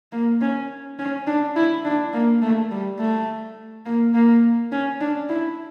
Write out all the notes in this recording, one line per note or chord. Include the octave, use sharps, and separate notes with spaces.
A#3
C#4
C#4
D4
E4
D4
A#3
A3
G3
A3
A#3
A#3
C#4
D4
E4